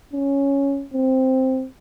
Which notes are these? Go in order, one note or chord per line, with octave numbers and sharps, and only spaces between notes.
C#4
C4